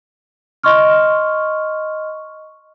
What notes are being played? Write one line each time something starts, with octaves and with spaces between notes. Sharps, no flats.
D#5 C6 C#6 F6